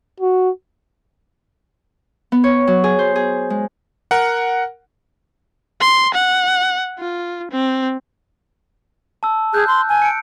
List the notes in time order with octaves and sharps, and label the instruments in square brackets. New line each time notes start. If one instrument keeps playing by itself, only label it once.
[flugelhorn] F#4
[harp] B3
C#5
F#3
G#4
C5
G#4
G#3
[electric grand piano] A#4 F#5
[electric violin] C6
F#5
F4
C4
[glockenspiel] A5 E6
[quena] G#4 [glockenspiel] F#6 G6
[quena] C6
G#5
[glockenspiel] C#7 D7